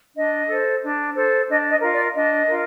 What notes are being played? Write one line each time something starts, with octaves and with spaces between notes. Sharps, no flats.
D4 D#5
A4 C5
D4
A4 C5
D4 D#5
D#5
F4 A#4
D5
D4 D#5
F4 A#4